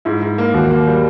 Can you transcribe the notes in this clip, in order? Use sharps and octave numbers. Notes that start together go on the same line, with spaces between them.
G#2 E4
G#2
A#3
D#2 F#4
A#3
G3